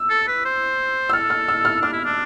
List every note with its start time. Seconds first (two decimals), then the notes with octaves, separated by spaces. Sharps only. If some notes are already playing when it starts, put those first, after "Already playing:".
Already playing: E6
0.10 A4
0.28 B4
0.45 C5
1.09 E6
1.13 A4 F6
1.30 F6
1.48 E6
1.65 F6
1.82 D4 F6
1.93 E4
2.05 D4